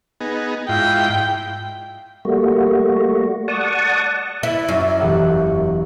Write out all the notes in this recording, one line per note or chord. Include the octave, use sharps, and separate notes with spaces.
B3 D#4 G#4
G#2 E4 F4 G5
G3 A3 A#3 F#4
D5 F#5 A5 C#6 D#6
E4 E6
F#2 E4 D5
E1 G4 F#5